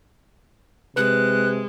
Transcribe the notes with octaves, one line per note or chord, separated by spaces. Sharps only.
C3 G#3 B4 F#6